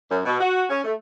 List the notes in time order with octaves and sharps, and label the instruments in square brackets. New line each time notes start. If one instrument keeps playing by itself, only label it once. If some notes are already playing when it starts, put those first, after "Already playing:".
[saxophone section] F#2
B2
F#4
C#4
A3